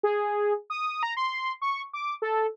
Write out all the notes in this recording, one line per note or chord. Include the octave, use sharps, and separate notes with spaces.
G#4
D#6
A#5
C6
C#6
D6
A4